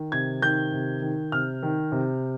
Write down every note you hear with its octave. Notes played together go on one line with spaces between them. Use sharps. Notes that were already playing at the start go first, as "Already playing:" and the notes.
Already playing: D#3
C3 G#6
D#3 G6
C3
D#3
C3 F6
D#3
C3